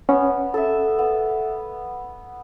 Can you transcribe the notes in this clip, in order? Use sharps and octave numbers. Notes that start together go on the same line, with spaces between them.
B3 C#4
A4 E5
B3